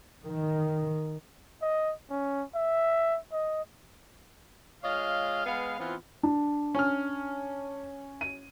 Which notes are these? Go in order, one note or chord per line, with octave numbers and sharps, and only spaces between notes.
D#3
D#5
C#4
E5
D#5
G#3 F4 C#5 D#5 F5
G#3 B3 B4 F5
E3 B3 C4 F4
D4
C#4 F6
D#7